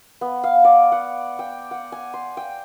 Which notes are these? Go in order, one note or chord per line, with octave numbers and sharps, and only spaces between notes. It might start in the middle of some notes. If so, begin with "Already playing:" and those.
B3
F5
D5
F#5
G5
F#5
G#5
C6
G5